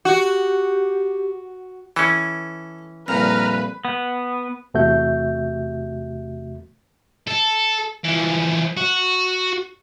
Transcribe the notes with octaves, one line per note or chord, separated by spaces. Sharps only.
F#4 G4
E3 C#4 A4
C2 F2 A#2 B4 A#5 F6
B3
E2 C3 A3 F#4 E5 G6
A4
E3 F3
F#4